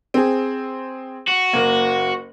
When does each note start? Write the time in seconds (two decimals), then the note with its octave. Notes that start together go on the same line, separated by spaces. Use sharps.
0.14 C4 G#4
1.28 F#4
1.53 F#1 A#3